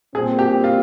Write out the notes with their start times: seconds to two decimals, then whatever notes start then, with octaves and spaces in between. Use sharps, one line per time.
0.15 A#2 G3 C4 G#4
0.39 G4
0.64 F4